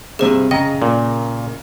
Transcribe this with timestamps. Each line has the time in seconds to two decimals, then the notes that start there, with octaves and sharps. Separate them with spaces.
0.19 G2 C3 G#4 C5
0.51 C#3 D#5 G5 A#5
0.82 A#2